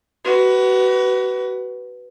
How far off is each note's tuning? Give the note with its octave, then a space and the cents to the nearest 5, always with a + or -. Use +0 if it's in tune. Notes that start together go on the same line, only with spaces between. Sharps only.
F#4 +30 B4 +0